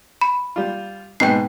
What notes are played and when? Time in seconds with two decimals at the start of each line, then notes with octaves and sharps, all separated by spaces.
0.21 B5
0.56 G3 F4
1.20 G#2 B2 B4 G5 C7